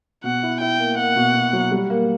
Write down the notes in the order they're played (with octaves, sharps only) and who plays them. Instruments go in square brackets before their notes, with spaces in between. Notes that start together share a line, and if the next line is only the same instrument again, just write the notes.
[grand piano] B2 [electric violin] F#5
[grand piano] E4
[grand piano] E4 [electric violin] G5
[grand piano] A#3
[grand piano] A#3 [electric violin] F#5
[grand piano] B2
B2
F#3
G3
A#3